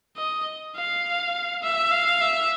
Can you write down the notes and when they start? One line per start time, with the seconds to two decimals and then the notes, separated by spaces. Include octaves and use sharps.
0.17 D#5
0.76 F5
1.63 E5
1.91 F5
2.21 E5